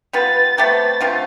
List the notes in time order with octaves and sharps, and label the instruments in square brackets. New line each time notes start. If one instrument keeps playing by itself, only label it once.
[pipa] G3 B3 F4 B4 [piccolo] A6
[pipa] A3 C4 G4 B4
D3 A3 C4 F4